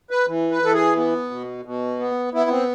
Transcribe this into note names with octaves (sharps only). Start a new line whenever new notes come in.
B4
E3
B4
E3 A4
G#4
B3
B2
B2
B3
B3 E4
C4